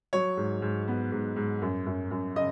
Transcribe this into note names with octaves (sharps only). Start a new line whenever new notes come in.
F#3 C#5
G#2
G#2
B3
G#2
G#2
F#2
F#2
F#2
C#3 D#5